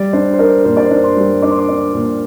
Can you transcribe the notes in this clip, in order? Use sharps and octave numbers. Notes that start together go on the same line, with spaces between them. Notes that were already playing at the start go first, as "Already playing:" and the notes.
Already playing: G3 D5
D4 C5
C5
D4 A#4
A#2 C5
D5
C5
D4
C6
G3
D4 D6
C6
D6
D4
A#2